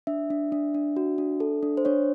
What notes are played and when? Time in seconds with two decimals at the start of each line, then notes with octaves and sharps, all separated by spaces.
0.07 D4 E5
0.30 D4
0.52 D4
0.74 D4
0.96 F#4
1.18 D4
1.40 A4
1.63 D4
1.77 C5
1.85 D4 C#5